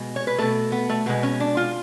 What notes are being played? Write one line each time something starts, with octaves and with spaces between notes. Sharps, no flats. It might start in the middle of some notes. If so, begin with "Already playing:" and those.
Already playing: B2 G#3
C#5
B4
B2 A3 A4
B3
A3
B2 G#3 B3
C#4
D4
F4